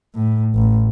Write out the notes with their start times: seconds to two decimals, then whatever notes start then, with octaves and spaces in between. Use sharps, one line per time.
0.15 A2
0.55 A1